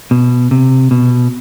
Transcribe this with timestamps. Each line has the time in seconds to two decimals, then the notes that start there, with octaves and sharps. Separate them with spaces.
0.11 B2
0.51 C3
0.91 B2